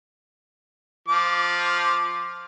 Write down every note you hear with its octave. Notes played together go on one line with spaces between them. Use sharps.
F3 D6